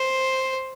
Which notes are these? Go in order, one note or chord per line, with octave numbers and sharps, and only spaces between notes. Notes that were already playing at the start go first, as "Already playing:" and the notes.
Already playing: C5